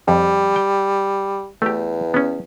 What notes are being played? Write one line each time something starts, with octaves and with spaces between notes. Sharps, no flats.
F2 G3
G5
E2 A3 G4
B3 C#4